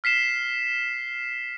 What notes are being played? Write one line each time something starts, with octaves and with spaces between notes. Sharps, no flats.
F6 B6 C7 E7